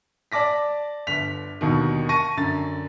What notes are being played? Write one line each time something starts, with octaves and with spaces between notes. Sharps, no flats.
D5 A5 D6 A#6 B6
G1 D3 B6 F7
D#2 B2 D3 D#3
A5 C#6 A#6 D#7
F#2 D3 A6